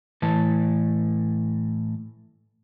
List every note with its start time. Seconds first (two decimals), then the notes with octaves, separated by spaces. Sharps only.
0.22 A2 E3 A5